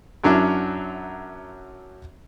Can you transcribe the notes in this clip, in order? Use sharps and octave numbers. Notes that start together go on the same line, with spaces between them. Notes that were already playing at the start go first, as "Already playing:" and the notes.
F#2 F#3 C#4 D4 E4